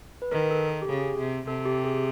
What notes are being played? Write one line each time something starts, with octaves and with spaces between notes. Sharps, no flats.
B4
D#3 A#4
A4
A4
G4
C#3 G#4
C3
C3 A4
G4
G#4